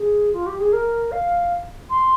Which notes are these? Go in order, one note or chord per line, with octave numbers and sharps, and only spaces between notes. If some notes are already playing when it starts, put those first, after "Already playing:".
Already playing: G#4
F4
G4
G#4
A#4
F5
C6